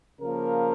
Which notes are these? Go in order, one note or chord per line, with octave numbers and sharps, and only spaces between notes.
C#3 F3 A#3 A#4